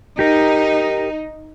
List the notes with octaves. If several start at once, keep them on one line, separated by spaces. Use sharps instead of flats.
D#4 G4 A#4